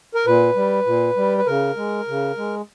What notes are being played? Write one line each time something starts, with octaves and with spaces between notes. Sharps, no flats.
A#4
A#2 B4
G3
A#2
G3
B4
C#3 A#4
G#3
C#3
G#3